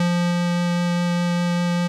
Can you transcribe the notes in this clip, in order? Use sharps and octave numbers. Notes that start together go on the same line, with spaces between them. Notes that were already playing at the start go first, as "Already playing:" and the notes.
Already playing: F3